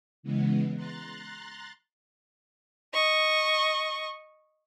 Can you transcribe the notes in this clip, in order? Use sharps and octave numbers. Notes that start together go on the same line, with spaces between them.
C#3 E3 G#3 B3
A#5 C6 F#6 A6
D#5 C#6